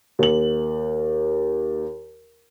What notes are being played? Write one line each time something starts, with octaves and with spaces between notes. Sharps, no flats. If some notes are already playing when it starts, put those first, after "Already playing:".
D#2 F#7